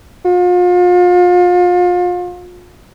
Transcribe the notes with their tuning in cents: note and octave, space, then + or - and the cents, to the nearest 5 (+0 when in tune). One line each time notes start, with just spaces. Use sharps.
F4 +35